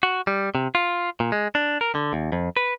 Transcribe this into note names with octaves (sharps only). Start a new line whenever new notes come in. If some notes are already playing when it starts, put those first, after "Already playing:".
F#4
G3
C3
F4
A#2
G#3
D4
A#4
D3
D#2
F2
B4